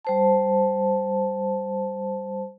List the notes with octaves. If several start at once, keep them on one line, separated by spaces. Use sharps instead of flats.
G3 C5 A5